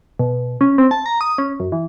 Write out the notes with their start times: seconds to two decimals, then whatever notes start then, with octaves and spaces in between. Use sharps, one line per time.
0.19 B2
0.61 C#4
0.78 C4
0.91 A5
1.06 A#5
1.21 D#6
1.38 C#4
1.60 F#2
1.72 E3